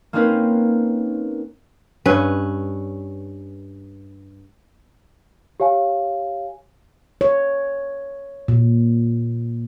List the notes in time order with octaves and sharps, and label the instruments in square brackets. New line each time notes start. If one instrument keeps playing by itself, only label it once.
[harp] A#3 C4 C#4 D#4 A#4 B4
[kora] G2 C#4 B4
[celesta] G4 C#5 F5 G#5
[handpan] C#5
A#2